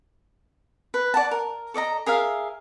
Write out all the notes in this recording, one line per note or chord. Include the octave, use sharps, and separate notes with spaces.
B4
D5 F#5 A5
A#4
A4 D5 D#5 A#5
G#4 A#4 E5 F5